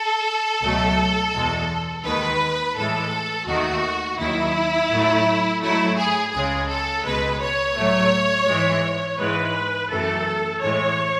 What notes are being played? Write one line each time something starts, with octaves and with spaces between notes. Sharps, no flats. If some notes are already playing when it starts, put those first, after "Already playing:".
Already playing: A4
C#2 B2 F#3 A3
E2 B2 G#3
D#2 D#3 G#3 B4
A2 E3 G#3 A4
D#2 D#3 A3 F#4
D#2 D#3 F#3 E4
A2 F#3 A3
G#2 F#3 A3 E4
G#4
C#2 C#3 G#3 G#4
A4
C#2 B2 G#3 B4
C#5
A2 F#3 A3
G#2 E3 G#3
G#2 E3 G#3 B4
F#2 E3 A3 A4
A2 E3 G#3 C#5